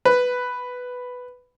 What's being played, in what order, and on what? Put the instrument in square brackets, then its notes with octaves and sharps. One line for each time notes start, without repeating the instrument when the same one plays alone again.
[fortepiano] B4